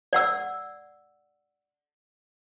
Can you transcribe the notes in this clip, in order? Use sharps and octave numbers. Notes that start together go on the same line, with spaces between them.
D5 F#5 E6